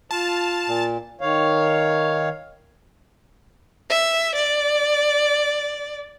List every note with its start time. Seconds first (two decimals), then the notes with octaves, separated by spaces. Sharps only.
0.11 F4 A5
0.68 A#2
1.21 D#3 C#5 F5
3.90 E5
4.36 D5